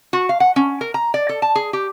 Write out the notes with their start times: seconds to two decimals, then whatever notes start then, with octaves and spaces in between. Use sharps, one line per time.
0.13 F#4
0.29 F5
0.40 F#5
0.56 C#4
0.81 A#4
0.94 A#5
1.14 D5
1.29 A4
1.42 A5
1.55 G#4
1.73 G4